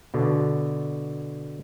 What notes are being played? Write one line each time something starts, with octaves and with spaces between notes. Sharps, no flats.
B2 D3